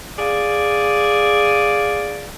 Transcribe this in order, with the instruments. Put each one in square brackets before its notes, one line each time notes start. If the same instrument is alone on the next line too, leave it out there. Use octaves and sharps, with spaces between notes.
[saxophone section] G#4 D5 F5